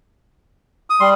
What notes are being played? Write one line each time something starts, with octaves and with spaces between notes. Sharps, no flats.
D#6
G3 C6